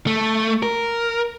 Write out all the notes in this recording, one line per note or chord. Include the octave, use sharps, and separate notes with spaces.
A3
A#4